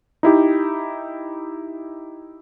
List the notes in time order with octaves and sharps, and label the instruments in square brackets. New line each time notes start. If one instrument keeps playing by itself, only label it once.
[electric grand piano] D#4 E4 G4